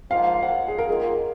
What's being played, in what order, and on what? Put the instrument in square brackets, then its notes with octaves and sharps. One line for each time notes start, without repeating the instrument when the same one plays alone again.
[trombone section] G#2 F3 A#3 F4 [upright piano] F5
[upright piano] F#5
F5
G#4
A#4
[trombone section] D#3 A#3 F4 [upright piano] G#4